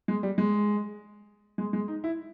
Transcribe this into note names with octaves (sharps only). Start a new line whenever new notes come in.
G#3
G3
G#3
G#3
G#3
D#4
E4